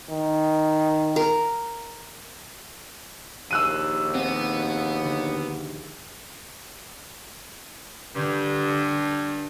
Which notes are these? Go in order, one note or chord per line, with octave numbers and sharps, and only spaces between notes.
D#3
A#4
A#1 D#2 E6 F#6 D#7
B3 C4
D3
G2 D3